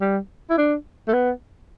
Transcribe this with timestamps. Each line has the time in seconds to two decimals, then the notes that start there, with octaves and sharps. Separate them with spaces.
0.01 G3
0.50 E4
0.58 D4
1.08 A3
1.13 B3